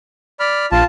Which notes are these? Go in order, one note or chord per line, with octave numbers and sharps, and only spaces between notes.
D5 B5 F6
A#1 F4 A5